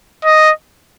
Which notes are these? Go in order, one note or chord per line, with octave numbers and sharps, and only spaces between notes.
D#5